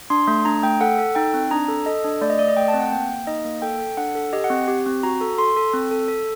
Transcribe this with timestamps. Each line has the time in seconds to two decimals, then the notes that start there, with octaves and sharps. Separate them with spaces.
0.10 D4 C6
0.27 A3
0.45 D4 A#5
0.63 A3 G5
0.81 A4 F#5
0.98 A4
1.15 D#4 G5
1.34 C4
1.51 D4 A#5
1.68 A4
1.86 A4 D#5
2.04 D4
2.21 A3 D5
2.30 D#5
2.39 A3 D5
2.48 D#5
2.57 A3 G5
2.68 A5
2.74 C4
2.80 F#5
2.92 A#3 G5
3.09 A#3
3.27 D#4 D#5
3.45 A#3
3.62 A4 G5
3.80 A4
3.97 D4 F#5
4.15 A4
4.33 G4 D#5
4.44 F#5
4.50 C4
4.68 G4
4.86 C4
5.03 F#4 A#5
5.21 A4
5.38 A4 C6
5.57 A4
5.74 C4
5.91 A4
6.08 A4